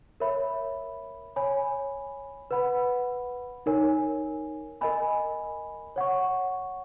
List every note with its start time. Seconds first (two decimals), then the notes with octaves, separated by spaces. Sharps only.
0.20 A#4 C#5 E5 B5
1.36 C#5 G#5 B5
2.51 B4 F#5 B5
3.66 D#4 A#4 C#5 G#5
4.81 A#4 D#5 G#5 B5
5.96 C#5 F#5 C#6